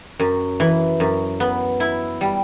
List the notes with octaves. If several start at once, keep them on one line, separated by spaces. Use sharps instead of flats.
F#2
E3
F#2
B3
E4
G3